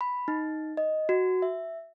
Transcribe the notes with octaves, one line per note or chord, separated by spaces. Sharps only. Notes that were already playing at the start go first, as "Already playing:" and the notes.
B5
D#4
D#5
F#4
E5